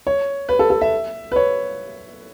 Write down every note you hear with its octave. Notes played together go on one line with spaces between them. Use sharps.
C#5
B4
A4
A4
E5
B4
C#5